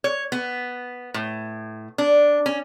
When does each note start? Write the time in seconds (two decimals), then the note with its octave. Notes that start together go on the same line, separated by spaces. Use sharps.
0.04 C#5
0.32 B3
1.14 A2
1.98 D4
2.46 C#4